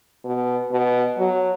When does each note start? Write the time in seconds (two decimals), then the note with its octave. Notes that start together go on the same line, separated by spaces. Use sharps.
0.24 B2
0.71 B2
1.18 F#3